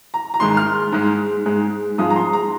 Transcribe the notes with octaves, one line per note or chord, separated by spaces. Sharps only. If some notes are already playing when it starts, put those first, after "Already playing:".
A#5
A#5
G#2 D#3 G#3 C6
F6
G#2 G#3
G#2 G#3
G#2 F3 G#3 D#6
A#5
C6
A#5